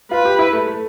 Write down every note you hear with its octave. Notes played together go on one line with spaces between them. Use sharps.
F4 B4
G4
E4
A3
A3